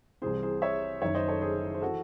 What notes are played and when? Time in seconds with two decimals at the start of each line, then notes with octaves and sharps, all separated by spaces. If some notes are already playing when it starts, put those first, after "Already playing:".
0.22 C2 C3 E3 G#4 C5
0.43 G#4 C5
0.62 C#5 E5
1.02 F#1 F#2 D#3 C#5 E5
1.15 C5 D#5
1.28 A4 C#5
1.41 G#4 C5
1.74 C5
1.81 E3 F#4 A4